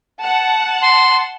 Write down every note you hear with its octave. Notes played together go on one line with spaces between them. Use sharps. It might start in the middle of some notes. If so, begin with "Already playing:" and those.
F#5 A5
C6